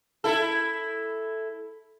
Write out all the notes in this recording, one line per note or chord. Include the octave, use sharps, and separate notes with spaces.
E4 A4